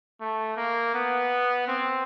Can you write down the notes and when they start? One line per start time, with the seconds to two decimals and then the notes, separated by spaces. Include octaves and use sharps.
0.21 A3
0.57 A#3
0.94 B3
1.68 C4